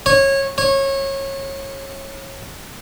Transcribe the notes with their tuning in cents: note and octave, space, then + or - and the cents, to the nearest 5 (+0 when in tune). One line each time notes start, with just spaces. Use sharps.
C#5 -20
C#5 -25